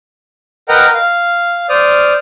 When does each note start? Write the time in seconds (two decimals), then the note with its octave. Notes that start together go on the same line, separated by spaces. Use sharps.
0.69 A#4 B4 D#5 F#5 G5 A#5
0.94 F5
1.69 C5 D5 D#6 F6